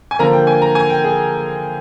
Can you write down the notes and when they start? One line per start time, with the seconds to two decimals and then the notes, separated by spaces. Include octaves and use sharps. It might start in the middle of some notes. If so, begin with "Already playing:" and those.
0.11 G#5
0.19 D3 F3 A#3 D4 A#5
0.33 G5
0.47 G#5
0.62 A#5
0.75 G#5
0.90 G5
1.04 G#4